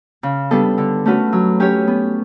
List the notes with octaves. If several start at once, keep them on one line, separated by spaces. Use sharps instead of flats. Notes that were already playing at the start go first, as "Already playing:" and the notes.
C#3
G3 B3 D4 A4
D3
A3 C#4 F#4 B4
F#3
C#4 G4 C#5
B3